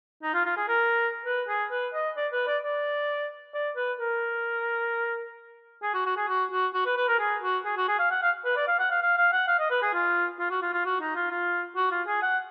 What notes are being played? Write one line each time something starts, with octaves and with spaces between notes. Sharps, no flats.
D#4
F4
F4
G#4
A#4
B4
G#4
B4
D#5
D5
B4
D5
D5
D5
B4
A#4
G#4
F#4
F#4
G#4
F#4
F#4
F#4
B4
B4
A#4
G#4
F#4
G#4
F#4
G#4
F5
F#5
F5
B4
D5
F5
F#5
F5
F5
F5
F#5
F5
D#5
B4
G#4
F4
F4
F#4
F4
F4
F#4
D#4
F4
F4
F#4
F4
G#4
F#5